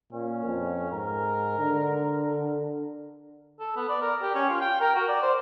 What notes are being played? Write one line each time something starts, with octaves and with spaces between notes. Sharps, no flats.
A#2 C#4
F2
G#2 A#4
D3
A4
B3
D5
A#4
G4
C#4
F4
G5
A#4
F#4
D5
C5